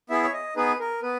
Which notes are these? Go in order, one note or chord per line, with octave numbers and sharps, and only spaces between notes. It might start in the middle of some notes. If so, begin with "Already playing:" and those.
B3 E4 G#4 E5
C#5
D#5
B3 D#4 G#4 B4
A#4
B3 B4